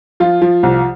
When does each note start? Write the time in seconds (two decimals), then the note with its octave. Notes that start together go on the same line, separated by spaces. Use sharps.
0.20 F3 F4
0.42 F3
0.63 C2